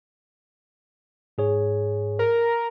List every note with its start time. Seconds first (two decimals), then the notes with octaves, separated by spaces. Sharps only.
1.38 G#2 G#4 C#5
2.19 A#4